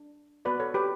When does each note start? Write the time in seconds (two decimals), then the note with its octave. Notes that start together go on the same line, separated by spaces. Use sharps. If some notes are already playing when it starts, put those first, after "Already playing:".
Already playing: D4
0.45 B3 F#4 B4 D5
0.60 A4 C#5
0.74 G4 B4